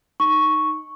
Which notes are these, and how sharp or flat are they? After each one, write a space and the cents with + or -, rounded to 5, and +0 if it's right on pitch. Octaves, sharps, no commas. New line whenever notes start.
D#4 +0 C#6 +0